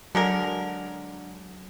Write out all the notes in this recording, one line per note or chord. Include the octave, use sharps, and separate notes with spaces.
D3 F#3 G#3 A#4